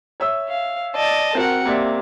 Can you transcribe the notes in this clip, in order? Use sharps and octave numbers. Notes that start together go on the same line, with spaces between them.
C#5 E5 E6
F5
D5 D#5 A5
C4 F#4 A#4 F#5
C3 A#3 D5 E5